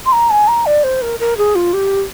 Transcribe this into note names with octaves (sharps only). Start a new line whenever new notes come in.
C6
A#5
G#5
A#5
D5
C5
A#4
A#4
G#4
F4
G4